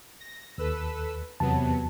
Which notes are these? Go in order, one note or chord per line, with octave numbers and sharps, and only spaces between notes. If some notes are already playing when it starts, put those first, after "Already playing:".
A#6
D#2 A4 B4 E6
E2 C3 F#3 B3 A5